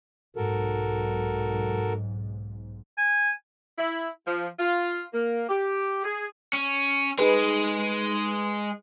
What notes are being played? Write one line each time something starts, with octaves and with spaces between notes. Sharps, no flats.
B1 G#2 F#4 A4 A#4
G#5
E4
F3
F4
A#3
G4
G#4
C#4
G#3 D#4 G#4 B4